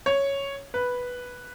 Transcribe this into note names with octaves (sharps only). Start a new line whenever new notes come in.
C#5
B4